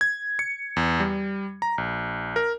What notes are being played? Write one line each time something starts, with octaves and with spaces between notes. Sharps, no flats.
G#6
C#7
E2
G3
A#5
A#1
A#4